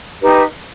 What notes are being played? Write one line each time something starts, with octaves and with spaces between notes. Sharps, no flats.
D#4 G4 B4